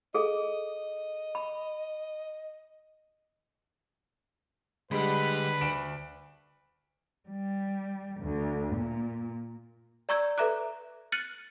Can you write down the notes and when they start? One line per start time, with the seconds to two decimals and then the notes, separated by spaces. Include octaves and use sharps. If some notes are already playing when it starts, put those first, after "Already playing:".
0.15 G#4 A4 D#5
1.35 B5
4.91 D3 G3 G#3 B4 B5
5.61 D2 D7 E7
7.29 G3
8.20 D2
8.75 A#2
10.09 D5 A#5 C#6 E6 G6 G#6
10.38 A4 B4 E5 A#5 D6 F#6
11.12 F6 F#6 A6 C#7 D#7 F#7